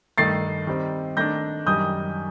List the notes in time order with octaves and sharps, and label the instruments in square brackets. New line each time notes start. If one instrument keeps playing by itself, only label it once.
[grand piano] G2 D#3 A3 A6 C7
D#3 G3 C4
D#3 A3 D4 G6 A#6
F#2 D#3 G3 D#6 G6